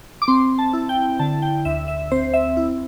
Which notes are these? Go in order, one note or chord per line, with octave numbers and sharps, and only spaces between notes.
D6
C4 C6
A5
E4
G5
D3 A5
G5
D2 E5
E5
C4 C5
E5
E4